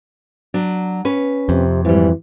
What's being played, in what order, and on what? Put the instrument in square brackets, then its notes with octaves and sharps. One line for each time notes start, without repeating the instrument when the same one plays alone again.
[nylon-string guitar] F#3 D4
C#4 B4
[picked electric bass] F2 [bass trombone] C3
[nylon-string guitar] G#2 G3 [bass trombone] E3